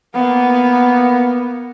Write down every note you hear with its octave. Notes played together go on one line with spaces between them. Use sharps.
A#3 B3